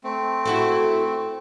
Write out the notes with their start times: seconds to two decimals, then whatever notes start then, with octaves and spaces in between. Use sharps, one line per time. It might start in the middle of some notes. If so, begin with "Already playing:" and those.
0.04 A3 C4
0.45 E4 F#4 A4